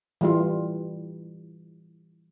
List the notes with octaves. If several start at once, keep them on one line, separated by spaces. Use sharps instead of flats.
E3 G3 F4